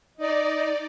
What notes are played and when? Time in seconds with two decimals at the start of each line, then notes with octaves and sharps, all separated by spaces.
0.17 D#4 D5 D#5